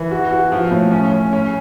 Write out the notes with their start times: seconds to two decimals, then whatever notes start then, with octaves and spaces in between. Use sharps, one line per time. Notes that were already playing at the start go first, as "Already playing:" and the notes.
Already playing: E3
0.11 F#4
0.31 F#4
0.52 F3
0.71 A2
0.91 C#4
1.11 C#4
1.33 C#4